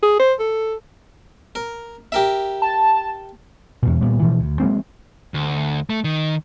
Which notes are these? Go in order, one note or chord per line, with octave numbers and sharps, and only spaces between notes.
G#4
C5
A4
A#4
G4 A#4 E5
A5
E2 G2 B2
A#2 G3 B3
B2 E3 F3
D2
F#3 G#3 A#3 C4
D2
A3
D#3